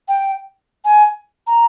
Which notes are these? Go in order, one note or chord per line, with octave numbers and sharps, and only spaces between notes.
G5
G#5
A#5